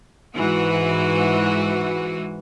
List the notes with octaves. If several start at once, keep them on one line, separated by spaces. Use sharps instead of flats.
G#2 E3 F#4